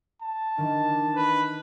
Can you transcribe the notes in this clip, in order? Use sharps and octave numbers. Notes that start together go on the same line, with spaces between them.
A5
D#3 E3 D4
B4